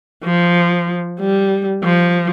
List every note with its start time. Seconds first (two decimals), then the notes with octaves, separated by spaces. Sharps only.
0.24 F3
1.20 G3
1.84 F3